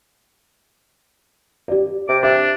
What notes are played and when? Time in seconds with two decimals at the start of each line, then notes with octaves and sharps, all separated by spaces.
1.68 G4 D5
2.09 C3 D6
2.23 D4 E5 D6